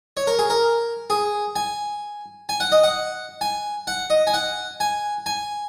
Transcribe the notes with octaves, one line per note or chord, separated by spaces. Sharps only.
C#5
A#4
G#4
A#4
G#4
G#5
G#5
F#5
D#5
F#5
G#5
F#5
D#5
G#5
F#5
G#5
G#5